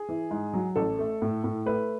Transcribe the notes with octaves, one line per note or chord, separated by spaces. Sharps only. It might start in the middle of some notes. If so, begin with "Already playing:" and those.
Already playing: G#4
E3
G#2
F#3
A1 A4
A3
A2
A2
A3 B4